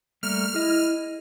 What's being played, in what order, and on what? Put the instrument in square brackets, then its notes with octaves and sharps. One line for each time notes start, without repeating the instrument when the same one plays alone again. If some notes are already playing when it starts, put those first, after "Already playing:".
[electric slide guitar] G3 A3 A#3 [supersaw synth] F6
[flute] E4 [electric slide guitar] G#4 D#5